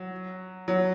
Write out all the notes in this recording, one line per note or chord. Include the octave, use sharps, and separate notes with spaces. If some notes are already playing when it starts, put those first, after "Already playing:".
Already playing: F#3
F#3